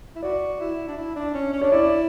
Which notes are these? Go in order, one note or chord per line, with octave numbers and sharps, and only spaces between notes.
E4
F#4 D5
E4
D4
E4
D4
C#4
C#4
D4 C#5
E4 D5